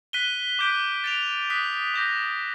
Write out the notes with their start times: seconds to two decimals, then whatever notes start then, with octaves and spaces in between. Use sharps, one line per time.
0.13 F#6 B6 D#7 G7
0.59 D6 G6 B6 D7 G7
1.04 A6 D7 F7
1.50 D#6 F#6 B6
1.94 D6 G6 A#6